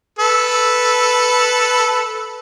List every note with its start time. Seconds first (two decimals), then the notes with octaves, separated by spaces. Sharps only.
0.19 A4 B4